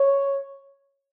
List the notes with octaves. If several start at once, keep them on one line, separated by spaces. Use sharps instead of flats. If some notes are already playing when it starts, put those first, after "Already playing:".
Already playing: C#5